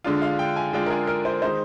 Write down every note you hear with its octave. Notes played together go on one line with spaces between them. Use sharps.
D3 G#3 D4 F4
F5
G5
G#5
D3 G#3 D4 F4 G5
A#4
G#4
A#4
C5
D#3 G#3 D#4 C5